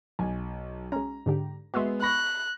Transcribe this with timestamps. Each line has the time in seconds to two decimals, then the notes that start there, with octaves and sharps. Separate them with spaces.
0.19 B1 G#5
0.92 G#3 C#4 A#5
1.26 G#2 D3 G4
1.74 G#3 B3 F#4 E5 C6
2.02 B5 C#6 F#6 A#6